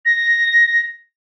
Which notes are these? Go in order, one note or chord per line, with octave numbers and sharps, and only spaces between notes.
A#6